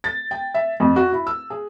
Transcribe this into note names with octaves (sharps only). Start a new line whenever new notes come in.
A6
G5
E5
F2
F#4
E4
E6
G#4